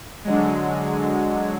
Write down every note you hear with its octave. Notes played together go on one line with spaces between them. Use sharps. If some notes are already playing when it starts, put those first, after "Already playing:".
D3 F#3 G#3